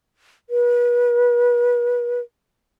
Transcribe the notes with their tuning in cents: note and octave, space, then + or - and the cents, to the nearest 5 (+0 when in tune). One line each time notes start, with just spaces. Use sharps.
B4 -35